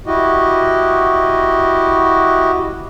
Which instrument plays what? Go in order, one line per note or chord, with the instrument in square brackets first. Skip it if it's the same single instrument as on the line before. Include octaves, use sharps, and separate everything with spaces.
[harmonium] E4 F#4 G4 D#5